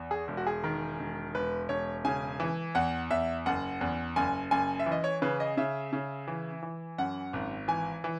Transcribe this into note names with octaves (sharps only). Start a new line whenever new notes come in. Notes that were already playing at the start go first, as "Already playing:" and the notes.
Already playing: E2
G#4
E1
F#4
G#4
D#3
E1
E1 B4
E1 C#5
C#3 G#5
E3
E2 F#5
E2 E5
F#1 F#5
E2
F#1 G#5
F#1 G#5
E5
E3
D#5
C#5
C#3 B4
D#5
C#3 E5
C#3
E3
E3
F#2 F#5
G#1
E3 G#5
E3